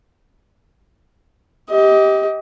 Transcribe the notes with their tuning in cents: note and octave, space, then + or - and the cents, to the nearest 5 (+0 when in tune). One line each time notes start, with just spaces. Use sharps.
G4 +0 D#5 +25